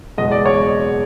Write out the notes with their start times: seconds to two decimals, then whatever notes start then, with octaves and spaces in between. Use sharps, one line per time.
0.18 F#1 E2 B2 G#3 D#5
0.31 D5
0.46 C#5